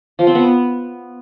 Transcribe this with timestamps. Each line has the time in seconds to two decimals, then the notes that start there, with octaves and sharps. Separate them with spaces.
0.19 F3
0.27 C4
0.35 B3